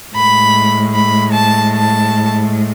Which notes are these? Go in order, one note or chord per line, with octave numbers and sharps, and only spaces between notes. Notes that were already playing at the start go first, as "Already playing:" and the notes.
A2 G#3 B5
B5
A5
A5